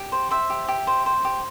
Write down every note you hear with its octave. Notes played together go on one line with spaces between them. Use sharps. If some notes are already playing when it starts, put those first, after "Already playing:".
Already playing: G4
C5
C5 E5
G4
G4
C5
C5
G4